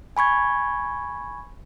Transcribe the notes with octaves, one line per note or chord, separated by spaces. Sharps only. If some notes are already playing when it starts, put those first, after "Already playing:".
G#5 B5 C#6 G#6